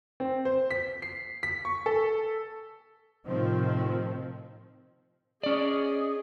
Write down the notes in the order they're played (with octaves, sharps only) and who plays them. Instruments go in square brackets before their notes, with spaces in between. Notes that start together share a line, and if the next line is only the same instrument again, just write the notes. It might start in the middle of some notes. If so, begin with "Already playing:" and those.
[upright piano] C4
C5
B6
C7
B6
C#6
A4
[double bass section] A2 C3 D#3 F3 C4
[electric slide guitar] C#4 D5 [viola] G#4 D#5